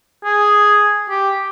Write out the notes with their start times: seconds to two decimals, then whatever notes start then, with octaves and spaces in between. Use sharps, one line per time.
0.25 G#4
1.10 G4